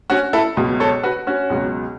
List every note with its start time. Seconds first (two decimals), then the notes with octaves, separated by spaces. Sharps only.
0.10 C#4 F#4
0.33 E4 A4
0.57 C#2 B2 F#3
0.80 A4 C#5
1.03 F#4 B4
1.27 C#4 F#4
1.50 C#2 B2 F#3